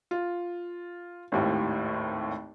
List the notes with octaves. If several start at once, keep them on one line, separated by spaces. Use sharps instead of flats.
F4
G#1 D#2 A2